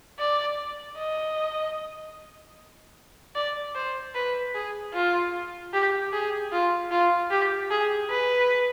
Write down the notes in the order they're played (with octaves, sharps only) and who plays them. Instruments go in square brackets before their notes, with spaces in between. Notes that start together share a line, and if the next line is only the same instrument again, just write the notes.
[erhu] D5
D#5
D5
C5
B4
G#4
F4
G4
G#4
F4
F4
G4
G#4
B4